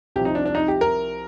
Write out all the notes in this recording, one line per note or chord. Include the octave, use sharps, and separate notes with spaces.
C2 C3 F3 G4
D#4
D4
D4
D#4
G4
A#4